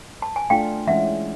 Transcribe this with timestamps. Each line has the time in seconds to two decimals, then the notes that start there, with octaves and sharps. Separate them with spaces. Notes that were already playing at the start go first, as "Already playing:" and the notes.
0.22 A5
0.36 G#5
0.50 A3 D4 F4 F5 G5
0.87 E3 G#3 C#4 E5 F#5